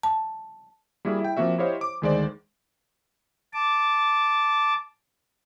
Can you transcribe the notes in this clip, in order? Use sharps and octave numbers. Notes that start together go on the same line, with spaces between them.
A5
G3 A#3 E4 F#4 G#4
E4 G5
F3 A#3 C4 F#4 E5
E4 G4 C5 C#5 D#5 F5
D6
D2 D#3 G#3 C5 D5
A5 D6